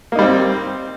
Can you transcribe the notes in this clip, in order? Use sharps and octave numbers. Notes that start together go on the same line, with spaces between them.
G3 A#3 C4 D#4